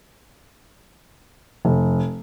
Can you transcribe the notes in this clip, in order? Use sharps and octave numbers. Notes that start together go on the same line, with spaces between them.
F1